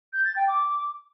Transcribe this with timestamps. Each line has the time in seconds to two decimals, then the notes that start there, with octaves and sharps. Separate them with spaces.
0.13 G6
0.25 A6
0.36 G5
0.48 D6